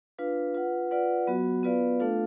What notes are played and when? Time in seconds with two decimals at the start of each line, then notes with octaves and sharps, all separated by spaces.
0.18 D4 F4 B4 F5
0.55 F4 B4 F#5
0.91 F4 B4 D5 F#5
1.27 F#3 B3 F#4
1.63 B3 F4 B4 D5 F5
2.00 A3 D4 F4 A4 F5